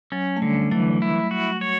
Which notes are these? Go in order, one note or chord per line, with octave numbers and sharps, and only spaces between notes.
F#3 C#4
A3
D3 G3
E3 F#3 A3
E4
F#4
C#5